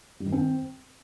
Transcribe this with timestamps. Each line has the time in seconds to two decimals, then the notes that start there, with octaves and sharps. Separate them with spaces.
0.20 G3
0.26 D#3
0.32 C4